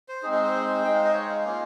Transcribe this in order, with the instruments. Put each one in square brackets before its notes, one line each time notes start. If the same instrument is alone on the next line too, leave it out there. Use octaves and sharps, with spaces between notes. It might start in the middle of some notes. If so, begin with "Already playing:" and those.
[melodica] C5
G#3 C4 D#4 G#4
G#4
C5
G#3 D#4 G5
F5
D#5
C#5
F5
A#3 C#4 F4